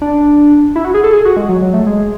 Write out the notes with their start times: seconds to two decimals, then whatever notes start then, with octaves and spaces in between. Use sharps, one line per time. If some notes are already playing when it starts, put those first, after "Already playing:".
0.01 D4
0.76 E4
0.85 F#4
0.94 G#4
1.04 A4
1.13 G#4
1.25 F#4
1.37 G#3
1.49 F#3
1.62 F#3
1.74 A3
1.86 G#3